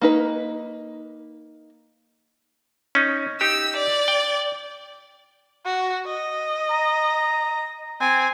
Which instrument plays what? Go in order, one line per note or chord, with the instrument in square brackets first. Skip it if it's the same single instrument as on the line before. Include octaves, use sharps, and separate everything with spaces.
[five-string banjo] A#3 D#4 B4
[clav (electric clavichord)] C#4 D#4
[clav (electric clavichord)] D#4 G4 [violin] E6
[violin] D5
[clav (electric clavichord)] G5
[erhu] F#4
D#5
[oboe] A#5
[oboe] C4 [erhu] G#5